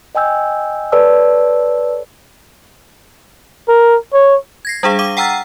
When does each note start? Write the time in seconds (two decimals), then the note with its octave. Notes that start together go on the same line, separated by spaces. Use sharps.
0.15 D#5 G5 G#5 E6 G6
0.92 A4 B4 C#5 D5 A5 E6
3.69 A#4
4.14 C#5
4.65 G#6 A#6 C7
4.83 G3 D4 G#4 F5
4.99 F5 D6 D#7
5.17 F#5 G5 A#5 E6 F6 A6